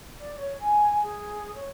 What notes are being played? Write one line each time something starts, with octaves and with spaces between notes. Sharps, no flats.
D5
C#5
G#5
G#4
C#5